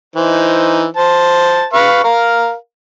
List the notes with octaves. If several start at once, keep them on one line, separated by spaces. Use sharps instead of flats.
E3 D#4 C5
C5 A5
B4 F5 C#6
A#4 F5